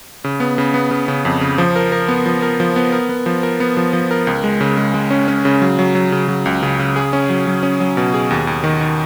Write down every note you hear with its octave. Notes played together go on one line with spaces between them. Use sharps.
C#3
B3
C#3
B3
C#3
C#3
F2
C#3
F3
A#4
A#4
B3
F3
A#4
F3
B3
A#4
B3
F3
A#4
B3
F3
F3
A#4
C#2
G#3
C#3
G#3
G#3
C#4
C#4
C#3
F#3
F#3
F#3
C#3
F#3
C#2
C#3
C#3
G#4
C#4
F#3
F#3
C#4
F#3
B2
G#4
D#2
D#2
D#3
D#3